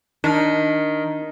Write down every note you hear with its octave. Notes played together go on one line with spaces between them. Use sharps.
D#3 D4